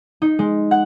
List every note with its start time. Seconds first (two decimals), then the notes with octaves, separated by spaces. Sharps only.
0.22 D#4
0.39 G#3
0.71 F#5